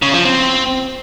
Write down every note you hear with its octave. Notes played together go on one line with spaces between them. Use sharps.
C#3
F3
C4